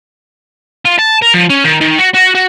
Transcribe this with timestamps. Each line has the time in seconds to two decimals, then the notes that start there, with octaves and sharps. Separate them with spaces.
0.85 F4
0.99 A5
1.22 A#4
1.34 F3
1.50 C#4
1.64 D#3
1.81 D#3
1.99 F#4
2.14 F#4
2.35 F#4